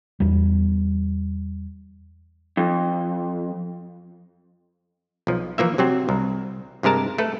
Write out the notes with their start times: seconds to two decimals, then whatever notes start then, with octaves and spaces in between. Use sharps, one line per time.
0.20 E2 G3
2.57 F2
5.27 B1 F3
5.58 E3 F3 A#3 E5
5.78 C3 F#3 C4
6.09 C2
6.83 G2 C3 G#3 A#4 A5
7.18 A3 A4 B4